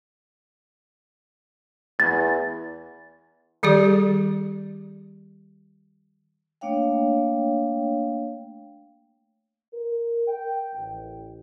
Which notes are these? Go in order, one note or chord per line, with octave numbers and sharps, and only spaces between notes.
E2 A6
D#3 G3 G4 G#4 D5
A3 A#3 D4 C#5 F5 G5
A#4
G5
A1